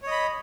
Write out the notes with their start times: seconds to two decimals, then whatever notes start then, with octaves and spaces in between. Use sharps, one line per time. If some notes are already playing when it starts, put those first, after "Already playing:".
0.03 C#5
0.07 D#5
0.11 B5